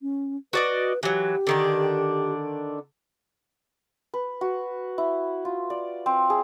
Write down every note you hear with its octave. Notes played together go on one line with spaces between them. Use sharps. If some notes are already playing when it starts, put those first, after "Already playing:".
C#4
F#4 B4 D5 D#5
E3 F#3 G4
D3 D#3 D4
B4
F#4
E4
F4
D5
C4
G#4